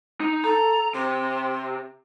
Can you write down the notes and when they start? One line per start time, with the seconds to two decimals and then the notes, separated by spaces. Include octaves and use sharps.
0.20 D#4
0.44 A4 A#5
0.94 C3 C6